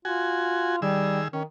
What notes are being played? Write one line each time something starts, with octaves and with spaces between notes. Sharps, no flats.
F4 F#4 G#5
D#3 G3 G#4 E6
D#3 C#4